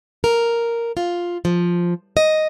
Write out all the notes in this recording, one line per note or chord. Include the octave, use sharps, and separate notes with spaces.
A#4
F4
F3
D#5